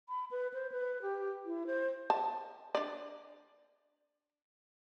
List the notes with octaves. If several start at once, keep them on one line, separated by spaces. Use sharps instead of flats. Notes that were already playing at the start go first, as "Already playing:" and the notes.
B5
B4
C5
B4
G4
E4
C5
A5
D4 D5